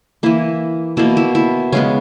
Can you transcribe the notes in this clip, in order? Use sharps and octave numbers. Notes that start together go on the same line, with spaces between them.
E3 A#3 E4
B2 A#3 E4
E4
E4
C#3 G#3 B3 C#4